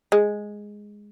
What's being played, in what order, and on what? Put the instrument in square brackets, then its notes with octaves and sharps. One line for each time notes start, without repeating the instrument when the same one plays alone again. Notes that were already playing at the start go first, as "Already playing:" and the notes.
[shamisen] G#3